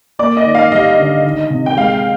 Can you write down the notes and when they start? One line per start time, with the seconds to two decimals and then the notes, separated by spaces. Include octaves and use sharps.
0.19 A#3 D5
0.37 D#5
0.45 D#3
0.55 F5
0.72 G3 D#5
0.98 D3
1.24 D#3
1.50 C3
1.66 G5
1.76 G#3 F5